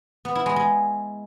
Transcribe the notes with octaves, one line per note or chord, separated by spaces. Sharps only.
B3
E4
G#3
G#3